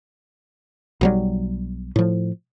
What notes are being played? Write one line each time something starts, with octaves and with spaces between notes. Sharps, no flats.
B1 F#3 G3
A2 F3